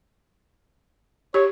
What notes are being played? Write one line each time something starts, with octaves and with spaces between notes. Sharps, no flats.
G4 C#5